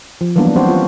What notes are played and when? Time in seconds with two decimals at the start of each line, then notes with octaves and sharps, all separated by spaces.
0.21 F3
0.36 E3 F#3 G3 A#3 B3 D4
0.56 C4 C#4 F#4 C5
0.68 F4